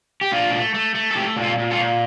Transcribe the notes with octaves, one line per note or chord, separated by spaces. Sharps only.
G4
A#2 D4 F4
A3
A3
A3
A4
A3 E4 G4
A#2
F4 A4
A#2
F4 A4
A#2